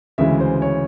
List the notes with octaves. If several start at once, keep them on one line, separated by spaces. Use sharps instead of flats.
D2 C#3 E3 G#3 E5
C5
C#5